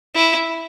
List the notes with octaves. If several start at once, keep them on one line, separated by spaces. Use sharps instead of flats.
E4